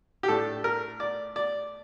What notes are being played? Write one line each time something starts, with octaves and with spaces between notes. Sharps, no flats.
G4
A2 A3 D4 A4
A#4
D5
D5